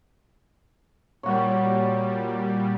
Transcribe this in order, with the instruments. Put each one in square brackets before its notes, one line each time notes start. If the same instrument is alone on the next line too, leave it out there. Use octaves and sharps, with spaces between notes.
[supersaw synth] A#2 G3 [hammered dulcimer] F#4 C#5